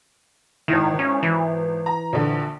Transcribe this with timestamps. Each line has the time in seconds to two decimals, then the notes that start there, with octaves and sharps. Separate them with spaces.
0.68 G#1 D#3 E4
0.99 C#4
1.23 E3
1.86 A#5
2.13 A#1 D3